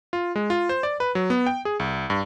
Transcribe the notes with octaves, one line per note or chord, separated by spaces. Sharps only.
F4
G#3
F4
C5
D5
B4
F#3
B3
G5
G#4
C2
G2